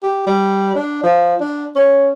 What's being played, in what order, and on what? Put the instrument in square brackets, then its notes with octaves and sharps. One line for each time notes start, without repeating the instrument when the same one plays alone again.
[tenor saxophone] G4
G3
D4
F3
D4
C#4